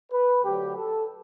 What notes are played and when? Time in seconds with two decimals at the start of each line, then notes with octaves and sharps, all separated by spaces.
0.12 B4
0.44 D2 D3 F#3 G4
0.76 A4